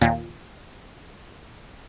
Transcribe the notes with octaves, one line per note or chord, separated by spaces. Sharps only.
D#2 A#2